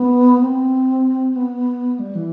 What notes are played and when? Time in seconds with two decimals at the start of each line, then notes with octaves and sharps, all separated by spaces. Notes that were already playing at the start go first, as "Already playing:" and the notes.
Already playing: B3
0.41 C4
1.36 B3
1.99 G3
2.15 E3